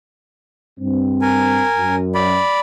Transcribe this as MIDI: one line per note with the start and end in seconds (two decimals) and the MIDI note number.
0.79 1.63 43
0.79 1.63 60
1.22 1.95 70
1.22 1.95 80
1.77 2.38 42
2.15 2.60 74
2.15 2.60 83